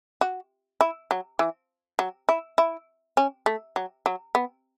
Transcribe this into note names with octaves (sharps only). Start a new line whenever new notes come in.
F#4
E4
F#3
E3
F#3
E4
E4
C#4
A3
F#3
F#3
B3